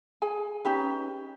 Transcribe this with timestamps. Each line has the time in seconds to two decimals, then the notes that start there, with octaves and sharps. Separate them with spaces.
0.22 G#4 G#5
0.65 C#4 D#4 G4 B4